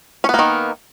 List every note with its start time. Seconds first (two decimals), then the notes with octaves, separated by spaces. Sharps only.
0.24 C#4
0.29 B3
0.34 A#3
0.39 D#3